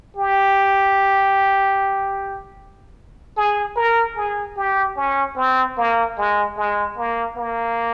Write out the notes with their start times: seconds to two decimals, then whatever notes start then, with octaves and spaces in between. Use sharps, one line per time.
0.16 G4
3.37 G#4
3.76 A#4
4.16 G#4
4.57 G4
4.97 C#4
5.36 C4
5.77 A#3
6.18 G#3
6.57 G#3
6.97 A#3
7.37 A#3